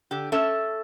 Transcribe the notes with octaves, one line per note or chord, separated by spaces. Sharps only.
D3 G4
C#4 A4 E5